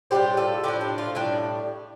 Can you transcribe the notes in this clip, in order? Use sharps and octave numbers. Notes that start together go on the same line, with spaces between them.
A2 G3 D4 G4 C5
F4 A4
A2 F3 D4 G4
G4
F4
A2 G3 D4 G4